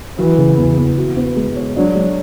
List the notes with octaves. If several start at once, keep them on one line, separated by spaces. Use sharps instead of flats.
E3 F#3
C#3
E2
E2
F#4
B3
G#3
C#5
F#3 D4
G#3